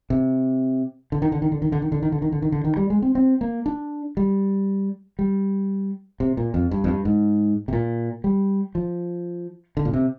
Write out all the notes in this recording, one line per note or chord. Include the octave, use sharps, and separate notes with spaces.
C3
D3
D#3
D3
D#3
D3
D#3
D3
D#3
D3
D#3
D3
D#3
D3
D#3
D3
D#3
G3
G#3
C4
C4
A#3
D4
G3
G3
C3
A#2
F2
G2
F2
G2
G#2
C3
A#2
G3
F3
D3
A#2
C3